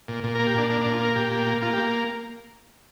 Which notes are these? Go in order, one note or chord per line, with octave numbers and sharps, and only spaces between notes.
A#2
A#2
A#4
A#3
G4
A#2 D4
A#3 D4
D4
A#2
F4
A#3 A#4
A#2 G4
A#3
A#3
A#3 F4
G4
A#3